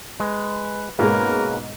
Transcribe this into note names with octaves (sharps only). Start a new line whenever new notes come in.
G#3 B4
G#2 B2 G#3 A#3 C#4 A#4 B4